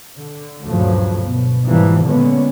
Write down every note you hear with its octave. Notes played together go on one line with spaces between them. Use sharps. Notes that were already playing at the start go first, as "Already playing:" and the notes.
D3
D2 G2 A#2 C#3 F3 F#3
B2
G#2 E3 F3 G3 A#3
A#2 D3 G#3 B3 C#4